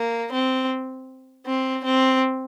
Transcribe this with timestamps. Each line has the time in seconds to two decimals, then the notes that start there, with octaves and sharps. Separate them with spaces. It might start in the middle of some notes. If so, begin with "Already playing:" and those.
Already playing: A#3
0.33 C4
1.46 C4
1.84 C4